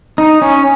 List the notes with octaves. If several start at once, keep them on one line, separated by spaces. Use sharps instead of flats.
D#4
C#4